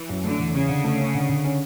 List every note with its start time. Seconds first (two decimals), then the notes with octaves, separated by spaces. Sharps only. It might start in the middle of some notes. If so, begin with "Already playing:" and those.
Already playing: E3
0.09 F#2
0.24 D3 A3
0.39 E2
0.54 C#3 C#4
0.69 D3
0.84 A3
1.00 C#4
1.14 D3
1.29 D3
1.44 C#4